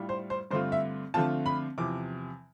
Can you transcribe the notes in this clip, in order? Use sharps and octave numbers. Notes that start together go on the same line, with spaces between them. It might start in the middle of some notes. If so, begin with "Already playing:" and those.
Already playing: A2 G3 D4 F4
C5
C5
G2 D3 A3 C4 F4 C5
E5
D3 F3 A3 C4 F4 A5
B5
E2 C3 F3 D6